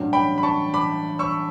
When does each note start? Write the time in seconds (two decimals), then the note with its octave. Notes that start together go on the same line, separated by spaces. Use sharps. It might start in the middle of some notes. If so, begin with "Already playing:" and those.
Already playing: A1 G2 F#3
0.13 G5 B5
0.38 B5
0.43 A5 C#6
0.74 B5 D6
1.19 C#6 E6